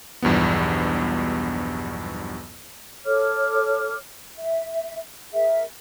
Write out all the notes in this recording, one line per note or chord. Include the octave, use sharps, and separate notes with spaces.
B1 E2 G2 F3 B3
A4 C#5 D6 F6
E5
G#4 A#4 E5